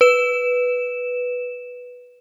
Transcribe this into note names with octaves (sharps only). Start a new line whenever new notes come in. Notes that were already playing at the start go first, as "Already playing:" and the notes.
B4 E7